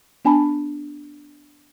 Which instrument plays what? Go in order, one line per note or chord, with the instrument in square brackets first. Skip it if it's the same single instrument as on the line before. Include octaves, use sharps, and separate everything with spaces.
[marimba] B3 D4 G#5 A5 B5